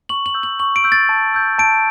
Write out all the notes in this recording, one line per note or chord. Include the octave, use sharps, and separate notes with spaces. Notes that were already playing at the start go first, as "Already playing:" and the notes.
C#6 F#7
F#7
E6 G6
F#7
C#6 F#7
D7
E6 G6
A6
A5
E6 G6
A5 D7